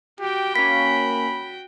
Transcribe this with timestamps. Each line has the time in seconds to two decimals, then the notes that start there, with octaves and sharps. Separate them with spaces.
0.20 F#4 G4 G5
0.56 A#3 C#4 B5 B6